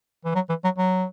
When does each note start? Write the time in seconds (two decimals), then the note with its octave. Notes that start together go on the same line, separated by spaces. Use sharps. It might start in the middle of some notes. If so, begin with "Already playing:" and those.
0.25 E3
0.35 F#3
0.49 E3
0.64 F#3
0.78 F#3